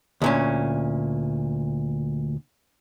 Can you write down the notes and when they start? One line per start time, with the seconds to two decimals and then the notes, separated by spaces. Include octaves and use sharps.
0.22 D2 A#2 C#4